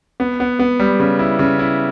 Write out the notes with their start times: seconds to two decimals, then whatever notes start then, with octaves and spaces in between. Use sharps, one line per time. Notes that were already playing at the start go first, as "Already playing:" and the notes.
0.20 B3
0.40 B3
0.59 B3
0.79 G3
1.00 C#3
1.19 E4
1.39 C#3
1.59 E4